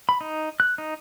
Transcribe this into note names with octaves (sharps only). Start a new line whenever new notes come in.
B5
D#4
F#6
D#4